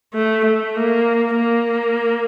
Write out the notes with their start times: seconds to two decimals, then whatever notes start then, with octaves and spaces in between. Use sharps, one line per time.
0.14 A3
0.45 A3
0.75 A#3
1.36 A#3